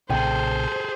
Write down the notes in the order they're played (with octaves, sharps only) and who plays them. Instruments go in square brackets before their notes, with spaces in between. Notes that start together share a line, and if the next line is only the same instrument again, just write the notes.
[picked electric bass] B1 A#2 C#3 [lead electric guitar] G#4 A4 [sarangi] C5 [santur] G5